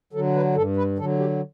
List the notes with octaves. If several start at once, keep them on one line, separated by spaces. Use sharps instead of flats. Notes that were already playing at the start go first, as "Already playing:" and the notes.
D3 F#3 A4
B4
G2 A4
B4
D3 F#3 A4
G4